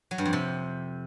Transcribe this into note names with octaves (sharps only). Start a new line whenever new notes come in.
F#3
G2
F2
C3